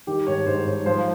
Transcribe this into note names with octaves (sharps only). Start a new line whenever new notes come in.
D#3 G4
G#2 C#5
G#2 C5
G#2 C#5
F3 C5